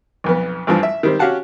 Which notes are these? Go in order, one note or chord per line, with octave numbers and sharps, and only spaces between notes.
B1 F2 B3
A1 G2 F3
E5
D#3 G3 C4
C#4 F#4 G4 F5 F#5 A5